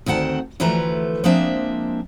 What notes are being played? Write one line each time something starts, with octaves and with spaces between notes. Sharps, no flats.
D2 D#3 C4 F#5 A5
D2 E3 F3 A3 B4 A#5
F3 G#3 A#3 C4 D4 E5